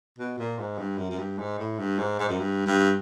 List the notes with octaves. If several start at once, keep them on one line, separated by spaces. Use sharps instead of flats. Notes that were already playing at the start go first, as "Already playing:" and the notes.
B2
A#2
G#2
G2
F#2
F#2
G2
G#2
A2
G2
G#2
G#2
F#2
G2
G2